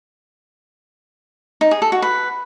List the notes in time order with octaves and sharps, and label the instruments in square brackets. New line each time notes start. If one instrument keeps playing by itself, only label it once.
[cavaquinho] D#4
G#4
A4
F#4
B4